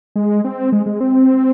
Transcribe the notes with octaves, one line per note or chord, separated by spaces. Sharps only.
G#3
C4
G#3
G#3
C4